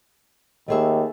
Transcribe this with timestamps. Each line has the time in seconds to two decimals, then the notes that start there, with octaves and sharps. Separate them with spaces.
0.68 D#2 A3 G#4 E5